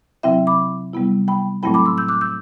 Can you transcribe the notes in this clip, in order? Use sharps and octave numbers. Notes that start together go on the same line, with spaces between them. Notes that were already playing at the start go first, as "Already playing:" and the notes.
C3 F#3 C4 E4 E5 G5
B5 D6
C3 G3 B3 E4
G5 B5
A2 F#3 A3 C4 E4 G5 B5
B5 D6
C6 E6
E6 G6
D6 F#6
E6 G6